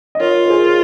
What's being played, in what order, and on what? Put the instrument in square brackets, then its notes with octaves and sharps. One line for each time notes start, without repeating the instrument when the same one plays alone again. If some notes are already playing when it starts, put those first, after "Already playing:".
[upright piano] D#5
[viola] F4 [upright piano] A#4 C#5
[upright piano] A#4
G#4 C5